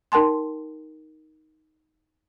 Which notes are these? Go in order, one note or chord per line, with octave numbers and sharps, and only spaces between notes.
D#4 A#4 G5 A5 C6